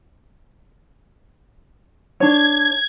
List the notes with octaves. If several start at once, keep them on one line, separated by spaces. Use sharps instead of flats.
D4 C#5 G#6